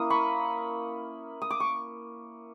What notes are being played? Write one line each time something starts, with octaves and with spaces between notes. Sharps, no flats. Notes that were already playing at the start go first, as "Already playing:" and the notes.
Already playing: A#3 C#4 E4 D#6
B5 C#6
D#6
D6
C#6